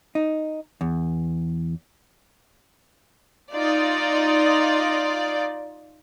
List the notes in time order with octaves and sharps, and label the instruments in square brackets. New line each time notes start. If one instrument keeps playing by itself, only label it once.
[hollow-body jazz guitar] D#4
E2
[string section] D#4 F4 D5